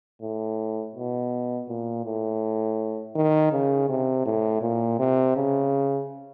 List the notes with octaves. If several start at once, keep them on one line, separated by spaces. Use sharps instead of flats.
A2
B2
A#2
A2
D#3
C#3
C3
A2
A#2
C3
C#3